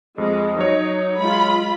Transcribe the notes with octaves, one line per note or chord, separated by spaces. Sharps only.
F2 G#3 D#5
F#3 D#4 C#5
G#3 F4 B5